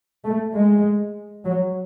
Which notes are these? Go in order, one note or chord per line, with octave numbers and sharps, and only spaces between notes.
A3
G#3
F#3